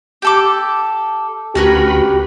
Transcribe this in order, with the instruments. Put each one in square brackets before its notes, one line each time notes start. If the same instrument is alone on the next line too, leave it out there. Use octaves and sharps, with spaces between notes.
[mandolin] G4 A4 D6
[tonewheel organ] D2 F#4 B5 [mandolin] C#4 A#4 B4 [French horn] G4